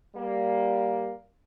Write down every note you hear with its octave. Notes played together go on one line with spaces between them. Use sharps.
G3 A#3